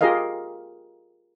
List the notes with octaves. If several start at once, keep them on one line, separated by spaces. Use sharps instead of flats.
F4 G4 G#4 A#4 D#5 F5